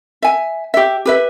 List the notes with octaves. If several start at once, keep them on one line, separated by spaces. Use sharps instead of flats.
E5 G#5
G4 E5
G4 B4 E5